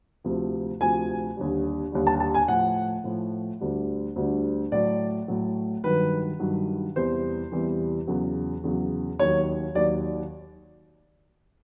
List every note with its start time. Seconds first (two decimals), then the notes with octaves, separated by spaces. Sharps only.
0.24 D2 C3 F3
0.81 D2 C3 F3 G#5
1.37 D#2 D3 G3
1.92 D#2 D3 G3
2.07 A5
2.20 A5
2.34 G#5
2.48 A2 F3 F#5
3.04 A2 F3
3.61 D2 D3 G3
4.16 D2 D3 G3
4.72 A2 F#3 D5
5.28 A2 F#3
5.84 G2 D#3 F#3 B4
6.40 G2 D#3 F#3
6.96 E2 C3 E3 G3 C5
7.52 E2 C3 E3 G3
8.07 E2 C#3 F#3
8.64 E2 C#3 F#3
9.19 D#2 D#3 F#3 C#5
9.75 D#2 D#3 F#3 D5